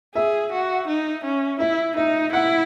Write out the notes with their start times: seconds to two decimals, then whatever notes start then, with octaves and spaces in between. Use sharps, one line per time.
0.15 G#4 E5
0.52 F#4
0.88 D#4
1.25 C#4
1.60 E4 E5
1.96 D#4 E5
2.33 E4 F#5